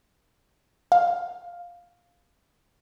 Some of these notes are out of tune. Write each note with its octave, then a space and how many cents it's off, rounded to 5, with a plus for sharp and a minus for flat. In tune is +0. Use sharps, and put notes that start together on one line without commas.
F5 +5